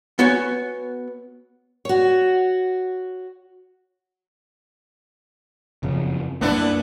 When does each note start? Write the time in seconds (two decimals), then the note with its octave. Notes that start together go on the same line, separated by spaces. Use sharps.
0.19 B3 F#4 C#5 G#5
1.85 F#4 C#5
5.83 F#1 F2 C#3
6.41 C2 F#2 A#3 B3 D4 E4